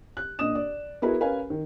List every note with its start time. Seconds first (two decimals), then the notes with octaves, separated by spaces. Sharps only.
0.17 F#6
0.39 A#2 D4 D#5 D#6 E7
0.55 D5
1.02 B3 E4 F#4 G#4 A#4 B4
1.20 C#4 A#4 B4 F5 G#5
1.50 D#3